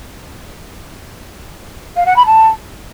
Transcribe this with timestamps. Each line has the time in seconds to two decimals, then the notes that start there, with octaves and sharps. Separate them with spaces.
1.96 F5
2.06 F#5
2.16 B5
2.26 A5